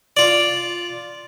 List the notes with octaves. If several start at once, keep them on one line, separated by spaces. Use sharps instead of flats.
F4 D5